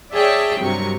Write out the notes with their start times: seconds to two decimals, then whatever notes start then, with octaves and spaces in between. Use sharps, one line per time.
0.14 G#4 C#5 D5 E5 G5 A5
0.61 G2 C3 F#3 A#4 C#6